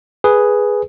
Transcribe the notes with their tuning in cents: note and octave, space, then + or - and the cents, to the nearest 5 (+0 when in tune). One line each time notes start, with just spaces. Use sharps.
G#4 +0 B4 +0